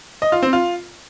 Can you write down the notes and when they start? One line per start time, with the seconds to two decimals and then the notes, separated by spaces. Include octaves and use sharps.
0.22 D#5
0.32 F4
0.43 C4
0.53 F4